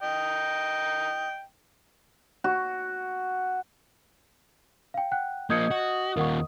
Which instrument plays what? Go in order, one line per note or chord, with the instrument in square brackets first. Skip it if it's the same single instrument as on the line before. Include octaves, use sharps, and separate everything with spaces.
[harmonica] D#5 G5
[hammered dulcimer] F#4
[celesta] F5 G5
F#5 G5 F#6
[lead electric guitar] F3 A#3 [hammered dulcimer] D#5 [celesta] G6 G#6 C#7
[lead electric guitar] F#4
[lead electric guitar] D#2 F4 [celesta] A#4 F#5 C#6